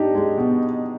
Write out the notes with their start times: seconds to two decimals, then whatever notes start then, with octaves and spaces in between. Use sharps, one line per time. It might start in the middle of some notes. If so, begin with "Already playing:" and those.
Already playing: D4 D#4 G4
0.15 G#3
0.38 B2